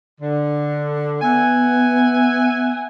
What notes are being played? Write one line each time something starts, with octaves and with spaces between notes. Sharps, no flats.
D3
B3 E5 F#5 G#5